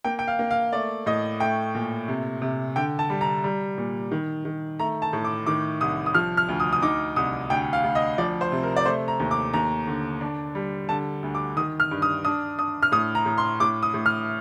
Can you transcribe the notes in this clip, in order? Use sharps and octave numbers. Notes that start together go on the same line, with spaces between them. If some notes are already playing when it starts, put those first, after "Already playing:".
A#3 G5
G5
F5
A#3
F5
A3 D5
A2 D#5
A3 G5
A#2
C3
C3
D3 G5
A5
G3
A#5
G3
A#2
D#3
D#3
A3 A#5
A5
A2
D6
D#3 D6
C2 D#6
D#6
F3 F6
F6
D2
D#6
D#6
D#4 D6
C2 D#6
D2 G5
F5
D2
D#5
F3 D5
C5
C3
A#4
D5
A3 C5
A#5
D#2
D6
D#2 A#5
D3
D4
G3
D3 A5
D2
D6
D#3 D#6
F6
G2
D#6
D4 D#6
D4 D#6
F6
A2 D#6
A#5
A2
C6
A2 D6
D#6
A2
F6